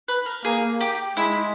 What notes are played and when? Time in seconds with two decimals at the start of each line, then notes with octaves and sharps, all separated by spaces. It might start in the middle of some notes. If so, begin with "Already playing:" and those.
0.08 B4
0.26 A#4
0.44 A#3 G#4
0.81 G4
1.17 G#3 E4